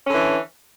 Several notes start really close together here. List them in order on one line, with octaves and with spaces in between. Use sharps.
C#4 D3 E3